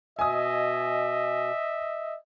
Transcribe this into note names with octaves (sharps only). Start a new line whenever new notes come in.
B2 D#5 E5 G#5 D#6